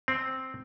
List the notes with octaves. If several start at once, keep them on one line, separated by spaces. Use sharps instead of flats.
C4